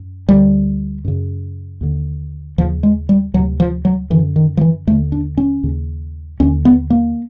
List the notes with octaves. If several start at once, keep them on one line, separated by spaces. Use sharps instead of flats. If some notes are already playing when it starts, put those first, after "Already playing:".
Already playing: F#2
D2 D3 G3
F#2 C#3
D#2 D3
D#2 C#3 F3
G#3
G3
D2 C3 F#3
F3
F#3
F#2 D3 E3
D#3
F3
E3
D#2 D3 A3
D4
C#4
D#2 C#3
D#2 D3 C#4
B3
A#3